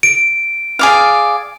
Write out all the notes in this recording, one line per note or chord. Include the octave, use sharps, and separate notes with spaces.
D7
G#4 D5 F5